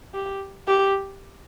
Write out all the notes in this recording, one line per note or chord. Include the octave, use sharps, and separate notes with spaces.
G4
G4